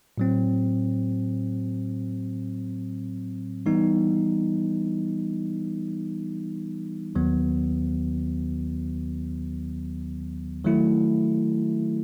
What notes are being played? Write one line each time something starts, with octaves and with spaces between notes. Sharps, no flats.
A2 F#3 C4
E3 G3 B3 D#4
D#2 D#3 F#3 B3
D#3 F#3 A3 E4